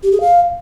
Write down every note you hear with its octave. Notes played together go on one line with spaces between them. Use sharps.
G4
G#4
F5